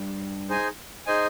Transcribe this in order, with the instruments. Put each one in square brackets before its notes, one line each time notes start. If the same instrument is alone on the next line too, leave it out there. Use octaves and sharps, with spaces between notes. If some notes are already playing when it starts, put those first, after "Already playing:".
Already playing: [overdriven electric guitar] G2
[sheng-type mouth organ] D#4 G#4 C5 D#5 G#5
D#4 G#4 C5 D#5 G#5